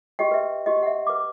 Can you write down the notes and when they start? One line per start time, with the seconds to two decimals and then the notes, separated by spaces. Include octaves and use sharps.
0.19 F#4 G4 D#5 G5
0.31 B4 E5
0.66 F#4 G4 D#5
0.83 E5 F#5
1.07 B4 D6